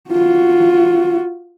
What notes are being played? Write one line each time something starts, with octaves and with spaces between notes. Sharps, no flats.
F4 F#4